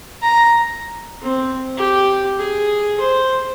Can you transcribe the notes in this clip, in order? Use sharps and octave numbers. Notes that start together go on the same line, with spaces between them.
A#5
C4
G4
G#4
C5